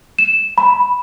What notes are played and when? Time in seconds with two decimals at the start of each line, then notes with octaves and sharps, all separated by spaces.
0.19 E7
0.58 B5